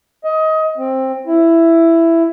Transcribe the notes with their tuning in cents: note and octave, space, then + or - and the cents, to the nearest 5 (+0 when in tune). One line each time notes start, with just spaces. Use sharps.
D#5 +20
C4 +15
E4 +10